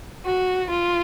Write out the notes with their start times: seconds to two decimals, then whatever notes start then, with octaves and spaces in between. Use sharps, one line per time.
0.27 F#4
0.69 F4